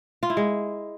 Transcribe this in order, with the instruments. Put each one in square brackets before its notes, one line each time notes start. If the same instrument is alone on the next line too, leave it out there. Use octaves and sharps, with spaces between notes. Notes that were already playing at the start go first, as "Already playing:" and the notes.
[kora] F4
E4
G#3